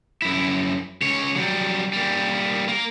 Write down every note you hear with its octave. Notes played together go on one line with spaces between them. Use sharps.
F#2 E4
C#2 C#5
F#3 G3
G3 A#3
A#3 A#4